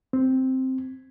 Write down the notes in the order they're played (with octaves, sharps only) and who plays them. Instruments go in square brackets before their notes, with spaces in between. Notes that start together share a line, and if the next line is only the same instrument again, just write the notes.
[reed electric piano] C4